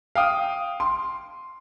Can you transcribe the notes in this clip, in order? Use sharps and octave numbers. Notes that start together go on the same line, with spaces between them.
F5 G5 D#6
C6